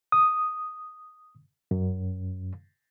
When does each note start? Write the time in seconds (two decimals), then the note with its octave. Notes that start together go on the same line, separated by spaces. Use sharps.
0.12 D#6
1.71 F#2